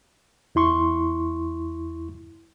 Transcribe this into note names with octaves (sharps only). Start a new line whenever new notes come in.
E2 E4 C6 C#6